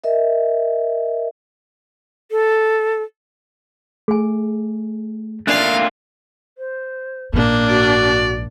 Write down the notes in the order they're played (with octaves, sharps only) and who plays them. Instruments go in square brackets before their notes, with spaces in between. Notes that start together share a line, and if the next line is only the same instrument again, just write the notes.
[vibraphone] A#4 D#5 E5
[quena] A4
[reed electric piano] A3 [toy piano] G#4 G#5
[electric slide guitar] A3 A#3 F4 [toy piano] D4 D5 [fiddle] F5 [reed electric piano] F#6
[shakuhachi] C5
[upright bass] A#1 G#2 [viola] A#3 D4
[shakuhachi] F#4 [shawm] D5